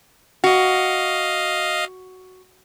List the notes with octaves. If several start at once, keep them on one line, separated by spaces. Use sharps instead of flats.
F#4 D#5 F5